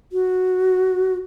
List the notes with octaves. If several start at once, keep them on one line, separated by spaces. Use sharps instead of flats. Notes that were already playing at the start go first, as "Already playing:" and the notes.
F#4